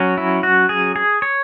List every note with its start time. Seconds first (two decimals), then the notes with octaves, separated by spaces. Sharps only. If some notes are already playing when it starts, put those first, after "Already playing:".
Already playing: F#3 C#4
0.18 E4
0.43 F#4
0.69 G#4
0.96 G#4
1.22 C#5